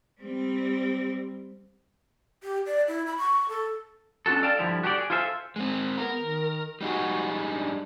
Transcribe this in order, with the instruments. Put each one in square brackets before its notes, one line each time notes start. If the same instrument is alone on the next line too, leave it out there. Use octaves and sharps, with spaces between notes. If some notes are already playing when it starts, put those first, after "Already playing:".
[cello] G3 C4
[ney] G4
D5
E4
B5
C#6
A4
[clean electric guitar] C#4 D4 F4 F#4 A4
A4 D5 F5 G5 A5
G2 D3 F3 G3 E4
F#4 G4 A4 C5 D5
G#4
F4 G#4 A4 C5 E5
[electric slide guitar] G#3 C4
[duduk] B3 [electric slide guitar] A#4
[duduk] D#3
[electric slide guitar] G3 D#4 G#4 [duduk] F#4
[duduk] D4